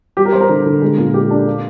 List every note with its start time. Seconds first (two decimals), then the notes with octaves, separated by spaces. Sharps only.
0.17 G3 G4
0.25 A#4
0.33 G3 C5
0.41 A#4
0.49 D3
0.66 D3
0.82 G#3
0.98 A#2
1.14 G#3 G4
1.31 D4
1.47 A#3